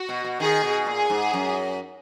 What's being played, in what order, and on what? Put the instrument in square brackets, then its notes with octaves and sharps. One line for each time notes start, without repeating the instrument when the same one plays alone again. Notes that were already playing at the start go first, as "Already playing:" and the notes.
Already playing: [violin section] F#4
[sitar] B2
B2
[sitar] D#3 [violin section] G#4
[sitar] B2
[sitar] A#2 [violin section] G#4
[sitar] G#2
F#2